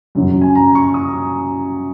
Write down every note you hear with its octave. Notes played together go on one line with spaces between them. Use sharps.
F#2 C#3 F#3
G#5
A#5
C#6
D#6